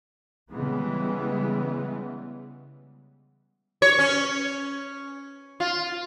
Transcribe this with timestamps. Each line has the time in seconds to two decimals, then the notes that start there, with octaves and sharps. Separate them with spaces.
0.51 C#3 E3 G3 G#3 B3
3.82 C#5
3.99 C#4
5.60 F4